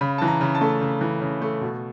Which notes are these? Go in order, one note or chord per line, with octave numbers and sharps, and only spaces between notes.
C#3 B5
E3 A5
A#5
C#3
A5
A3
C#3
E3
C#3
A3
B2